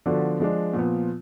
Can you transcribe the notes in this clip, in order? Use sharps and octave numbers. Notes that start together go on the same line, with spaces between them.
D3 F3 B3 D4 F#4
F3 G#3 D4
A#2 F3 B3